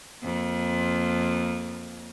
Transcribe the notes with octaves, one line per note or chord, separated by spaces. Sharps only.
F2 A#3